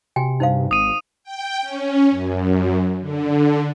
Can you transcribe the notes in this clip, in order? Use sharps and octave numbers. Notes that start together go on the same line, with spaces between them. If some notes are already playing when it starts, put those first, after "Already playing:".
C3 F#4 G5 G#5
G2 D#4 C5 F5
G#1 D#6 D#7
G5
C#4
F#2
D3